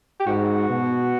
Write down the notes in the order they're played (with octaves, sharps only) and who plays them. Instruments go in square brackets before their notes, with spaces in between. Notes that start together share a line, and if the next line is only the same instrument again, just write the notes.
[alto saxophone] G4
[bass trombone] G#2 [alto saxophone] F#4
[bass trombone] B2